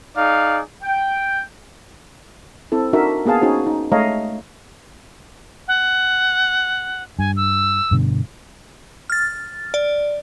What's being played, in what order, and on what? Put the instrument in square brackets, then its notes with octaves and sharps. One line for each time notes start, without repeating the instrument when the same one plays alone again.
[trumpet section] D#4 G#4 D5 F5
G5
[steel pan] C4 E4 A4
D4 D#4 F#4 A#4 E5
A#3 B3 G#4 F5 A5
C#4 D#4 F#4 G#4 C5
D#4
G#3 A3 C#5 D#5 F5 A#5
[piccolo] F#5
[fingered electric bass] G2 [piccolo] G#5
[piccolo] E6
[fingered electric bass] G2 B2 D3
[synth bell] F6 A6
D5